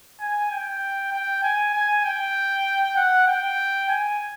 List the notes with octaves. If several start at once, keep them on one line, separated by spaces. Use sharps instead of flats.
G#5
G5
G5
G#5
G#5
G5
F#5
G5
G#5